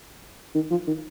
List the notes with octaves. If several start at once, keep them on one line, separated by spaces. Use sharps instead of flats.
D#3
F3
D#3